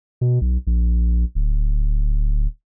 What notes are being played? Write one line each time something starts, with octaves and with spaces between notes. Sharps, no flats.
B2
B1
A#1
D1